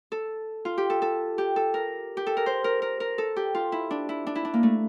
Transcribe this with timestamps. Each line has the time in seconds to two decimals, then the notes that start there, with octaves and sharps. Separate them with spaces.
0.12 A4
0.65 F4
0.78 G4
0.90 A4
1.02 A4
1.38 G4
1.56 A4
1.74 A#4
2.17 G4
2.27 A4
2.37 A#4
2.46 C5
2.64 A#4
2.82 A#4
3.00 A#4
3.18 A4
3.36 G4
3.55 F4
3.72 E4
3.91 D4
4.09 E4
4.27 D4
4.35 E4
4.45 D4
4.54 A#3
4.63 A3